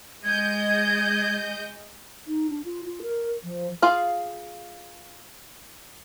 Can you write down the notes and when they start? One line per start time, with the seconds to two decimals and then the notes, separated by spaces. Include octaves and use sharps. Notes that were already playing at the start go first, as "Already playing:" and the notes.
0.24 G#3 D#5 G6 G#6
2.27 D#4
2.50 D4
2.65 F4
2.85 F4
3.02 A#4
3.43 F3
3.82 F4 G#4 F5